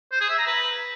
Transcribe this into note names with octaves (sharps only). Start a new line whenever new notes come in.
C5
G#4
E5
A#5
B4